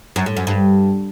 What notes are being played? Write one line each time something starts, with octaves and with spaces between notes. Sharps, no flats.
F#2
A2
F#2
G2